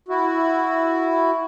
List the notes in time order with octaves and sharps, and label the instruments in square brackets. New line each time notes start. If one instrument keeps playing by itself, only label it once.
[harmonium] E4 F#4